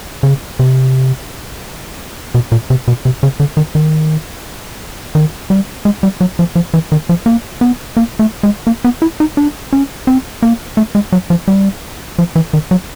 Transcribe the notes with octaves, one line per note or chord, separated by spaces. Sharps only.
C#3
C3
B2
A#2
C3
B2
C3
C#3
D3
D#3
D#3
D#3
G3
G#3
G3
F#3
F3
F3
E3
D#3
F3
A#3
B3
A#3
A3
G#3
A#3
B3
E4
D#4
D4
C#4
C4
A#3
A3
G#3
F#3
F3
G3
F3
E3
D#3
F#3